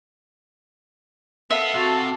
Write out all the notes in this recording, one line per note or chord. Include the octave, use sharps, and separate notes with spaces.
B3 A4 E5 F5
C3 F#4 A5